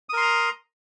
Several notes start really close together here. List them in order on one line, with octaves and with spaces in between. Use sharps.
D#6 A#4 C6 A#5